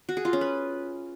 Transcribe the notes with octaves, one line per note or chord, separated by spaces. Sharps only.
F#4
G#4
F4
C#4
B4